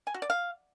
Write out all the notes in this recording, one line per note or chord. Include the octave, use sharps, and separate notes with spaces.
G#5
F#4
D5
F5